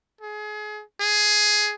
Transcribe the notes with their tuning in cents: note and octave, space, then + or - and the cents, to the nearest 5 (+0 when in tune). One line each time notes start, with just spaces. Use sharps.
G#4 +30
G#4 +10